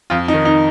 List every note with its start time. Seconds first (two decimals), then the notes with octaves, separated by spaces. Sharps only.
0.10 F2 F4
0.28 D#4
0.34 D#3
0.45 D#4